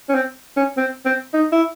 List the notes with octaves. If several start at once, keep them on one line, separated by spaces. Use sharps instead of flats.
C#4
C4
C#4
C4
C4
D#4
E4